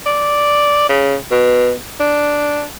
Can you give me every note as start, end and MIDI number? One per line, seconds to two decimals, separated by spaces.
0.06 0.89 74
0.89 1.16 49
1.31 1.74 47
2.00 2.64 62